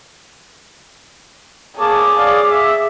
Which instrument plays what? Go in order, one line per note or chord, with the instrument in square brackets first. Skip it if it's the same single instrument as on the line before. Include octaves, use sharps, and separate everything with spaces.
[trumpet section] A#3 C#5 A5 [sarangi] G#4 [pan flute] D6
[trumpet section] C#5 D5 F5
E5